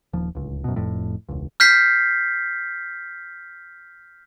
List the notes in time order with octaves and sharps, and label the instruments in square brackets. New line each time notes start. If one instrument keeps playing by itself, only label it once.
[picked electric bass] D#1 F3
D1 C#2
F#2 B2
F1 F2 A2
E1 C#2
[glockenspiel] F6 G6 B6 C7